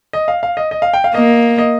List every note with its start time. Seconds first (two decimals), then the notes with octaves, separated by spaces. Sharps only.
0.13 D#5
0.28 F5
0.43 F5
0.57 D#5
0.71 D#5
0.82 F5
0.93 G5
1.04 F5
1.15 A#3 D#5
1.58 D#5